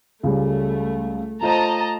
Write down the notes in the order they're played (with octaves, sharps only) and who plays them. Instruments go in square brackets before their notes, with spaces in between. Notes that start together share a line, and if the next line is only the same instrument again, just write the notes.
[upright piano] C#2 C#3 G3 [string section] A3
[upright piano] A3 F4 C5 [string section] D#5 A5 A#5